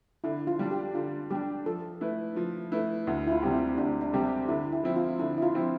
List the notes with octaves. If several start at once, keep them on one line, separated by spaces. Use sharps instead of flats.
D3 E4
F4
G3 D4
G4
D3 F4
G3 D4 G4
F3 A4
A3 E4 B4
F3
A3 E4 B4
D2 E4
E4
F4
C3 G3 C4 G4
E4
D2 D4
D4
C3 G3 C4 G4
D3 E4
E4
F3 C4 E4
F4
D3 E4
E4
F4
F3 C4 E4